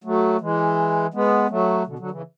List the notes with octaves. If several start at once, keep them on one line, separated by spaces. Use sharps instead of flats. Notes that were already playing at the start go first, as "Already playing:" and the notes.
F#3 A3
E3 G#3
G#3 B3
F#3 A3
B2 D3
D3 F#3
C#3 E3